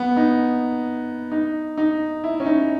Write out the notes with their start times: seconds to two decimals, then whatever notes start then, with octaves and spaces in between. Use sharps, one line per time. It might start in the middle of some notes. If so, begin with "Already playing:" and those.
Already playing: B3
0.17 D#4
1.32 D#4
1.77 D#4
2.24 E4
2.40 C#4
2.46 D#4